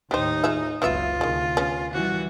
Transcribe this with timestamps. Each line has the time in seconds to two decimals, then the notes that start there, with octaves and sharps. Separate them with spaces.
0.11 D#2 A2 D#4 G4 C5
0.44 F4 G#4 E5
0.82 F#1 C#2 F#3 B3 F4 E5
1.21 D2 C3 D#3 G#3
1.57 C#3 B3 C#4
1.93 E3 G3 F#4